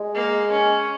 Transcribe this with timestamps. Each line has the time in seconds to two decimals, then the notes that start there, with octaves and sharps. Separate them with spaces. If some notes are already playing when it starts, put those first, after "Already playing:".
Already playing: G#3
0.15 A#3
0.52 C#4